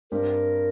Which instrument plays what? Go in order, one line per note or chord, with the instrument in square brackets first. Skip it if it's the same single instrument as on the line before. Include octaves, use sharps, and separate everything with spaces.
[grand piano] G2 G3 C4 G4 [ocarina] A#4